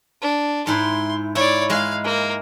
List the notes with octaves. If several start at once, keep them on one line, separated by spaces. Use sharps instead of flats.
D4
G#2 E4 C6
E4 C#5 D5
G#3 F5
A#3